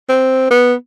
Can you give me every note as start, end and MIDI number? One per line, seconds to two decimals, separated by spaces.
0.09 0.47 60
0.51 0.74 59